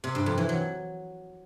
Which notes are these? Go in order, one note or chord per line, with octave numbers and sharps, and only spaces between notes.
C3
G2
F2
E3
F#3